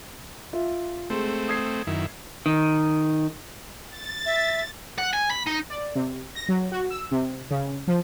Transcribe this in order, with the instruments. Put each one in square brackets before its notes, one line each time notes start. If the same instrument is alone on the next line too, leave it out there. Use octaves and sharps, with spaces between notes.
[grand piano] F4 E5
[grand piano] G#3 C6 [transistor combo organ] A3 C4
[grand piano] D#6 G#6 C7
[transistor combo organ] F#2 D#3 E4
[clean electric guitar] D#3
[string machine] A6
[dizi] E5
[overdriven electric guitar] F#5
G#5
B5
D#4
[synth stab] D5
C3
A#6
F#3
F#4
E6
C3
C#3
F3